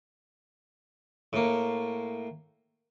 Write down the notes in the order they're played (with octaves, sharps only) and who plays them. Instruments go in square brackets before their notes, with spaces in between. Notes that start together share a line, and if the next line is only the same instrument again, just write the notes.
[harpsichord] A2 A#3